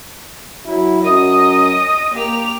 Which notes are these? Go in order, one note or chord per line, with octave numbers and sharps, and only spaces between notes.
F#3 E4
F#2 D#5 D#6
A#3 G4 F7